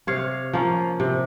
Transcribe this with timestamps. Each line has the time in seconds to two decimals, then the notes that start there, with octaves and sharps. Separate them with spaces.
0.07 C3 C#5 F5
0.53 F3 A#3 C#4
1.00 C3